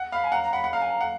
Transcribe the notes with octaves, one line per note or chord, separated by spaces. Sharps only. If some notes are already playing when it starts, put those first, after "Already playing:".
Already playing: F#5
F5 B5
G#5
F#5 A#5
A#5
F#5 B5
F#5
F5 A#5
G#5
A#5
F#5